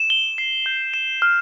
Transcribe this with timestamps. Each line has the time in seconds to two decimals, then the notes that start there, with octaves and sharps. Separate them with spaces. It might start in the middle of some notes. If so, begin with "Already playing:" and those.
Already playing: E7
0.10 G7
0.38 C7
0.66 G6
0.94 E7
1.22 F6